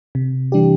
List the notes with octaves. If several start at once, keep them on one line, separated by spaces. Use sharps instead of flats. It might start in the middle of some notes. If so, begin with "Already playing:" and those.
C3
E3 G3 D4 G4